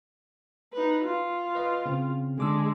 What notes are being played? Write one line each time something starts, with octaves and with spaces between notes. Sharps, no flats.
D#4 B4
F4
B4 D#5
C#3 C4
D3 G#3 D4 D6 E6